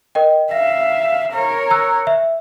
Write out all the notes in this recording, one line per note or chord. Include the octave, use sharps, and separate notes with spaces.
A#4 D#5 G5
E5 F5 A#6
A#4 C#5
A#5 E6 F#6
E5